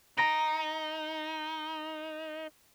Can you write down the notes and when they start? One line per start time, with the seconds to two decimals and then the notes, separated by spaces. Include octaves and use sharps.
0.17 D#4 A#5 A#6 D7